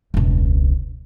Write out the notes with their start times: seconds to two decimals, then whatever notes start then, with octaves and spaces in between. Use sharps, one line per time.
0.14 E1 C#2